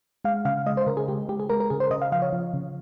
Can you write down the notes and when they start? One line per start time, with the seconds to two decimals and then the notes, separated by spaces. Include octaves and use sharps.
0.24 G#3 F5
0.45 C#3 F5
0.66 G#3 D#5
0.77 C5
0.87 C#3 A#4
0.97 G#4
1.08 G#3 G4
1.29 G#3 G4
1.40 G#4
1.50 G#3 A#4
1.60 A#4
1.70 C#3 G#4
1.80 C5
1.91 C#3 D#5
2.02 F5
2.12 F3 F5
2.22 C#5
2.33 F3
2.54 C#3